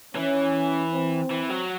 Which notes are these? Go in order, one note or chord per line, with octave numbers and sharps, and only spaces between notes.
E3 C#4
C4
E3
F#3